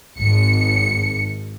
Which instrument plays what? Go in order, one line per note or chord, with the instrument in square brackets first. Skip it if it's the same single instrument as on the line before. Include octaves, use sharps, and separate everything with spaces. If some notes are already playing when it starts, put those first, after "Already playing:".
[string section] G#1 C#7